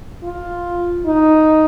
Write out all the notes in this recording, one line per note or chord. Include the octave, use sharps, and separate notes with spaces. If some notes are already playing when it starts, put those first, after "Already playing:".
F4
D#4